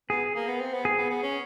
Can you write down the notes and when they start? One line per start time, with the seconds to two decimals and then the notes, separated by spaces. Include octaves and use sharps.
0.10 B3 G#4
0.36 A#3
0.48 B3
0.60 C4
0.74 B3
0.85 G#4
0.98 B3
1.10 B3
1.23 C#4